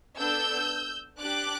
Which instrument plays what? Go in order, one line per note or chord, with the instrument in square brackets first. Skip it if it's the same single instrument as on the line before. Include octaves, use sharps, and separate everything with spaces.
[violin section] B3 D4 A4 E6 G6
D4 G4 D6 F#6